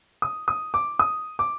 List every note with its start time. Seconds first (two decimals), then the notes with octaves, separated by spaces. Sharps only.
0.22 D#6
0.48 D#6
0.74 D6
0.99 D#6
1.39 D6